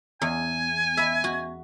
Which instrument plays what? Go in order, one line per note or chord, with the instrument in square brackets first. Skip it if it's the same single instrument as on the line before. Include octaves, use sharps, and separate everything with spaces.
[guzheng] E2 [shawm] G#5
[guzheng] E5 B5
F#4